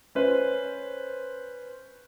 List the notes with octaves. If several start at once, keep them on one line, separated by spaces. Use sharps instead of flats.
C#4 B4 C5